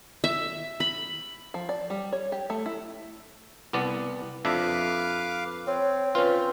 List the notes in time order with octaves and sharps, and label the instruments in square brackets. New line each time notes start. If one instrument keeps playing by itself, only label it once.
[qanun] E5
B5
[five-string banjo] F3
D5
G3
C#5
G4
A3
E4
[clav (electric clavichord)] C2 B3 D5
[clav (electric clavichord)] F2 D4 E5 [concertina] B4 F5 D6
[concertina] C4 [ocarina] C#5
[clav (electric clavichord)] C#4 F4 [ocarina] B4